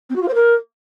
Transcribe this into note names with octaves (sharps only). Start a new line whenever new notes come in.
C4
F#4
F4
C5
A#4